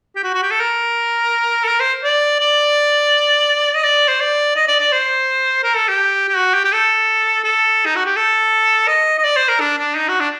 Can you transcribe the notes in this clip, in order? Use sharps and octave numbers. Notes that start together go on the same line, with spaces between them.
G4
F#4
F#4
G4
A4
A#4
A4
A#4
C5
D5
D5
D#5
D5
C5
D5
D#5
D5
D5
C5
A#4
A4
G4
G4
F#4
G4
G4
A4
A4
D#4
F#4
G4
A4
D#5
D#5
D5
C5
A#4
D4
D4
D#4
F#4
D4